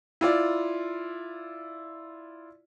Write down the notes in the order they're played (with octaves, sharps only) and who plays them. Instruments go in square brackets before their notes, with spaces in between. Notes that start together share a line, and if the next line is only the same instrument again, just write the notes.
[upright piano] E4 F4 D5